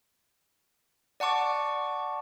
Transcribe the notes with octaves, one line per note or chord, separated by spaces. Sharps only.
D5 F#5 A5 C#6 D6